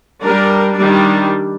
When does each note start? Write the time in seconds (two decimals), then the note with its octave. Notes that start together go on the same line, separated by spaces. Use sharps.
0.23 G3 D4 A#4
0.76 D#3 G3 D4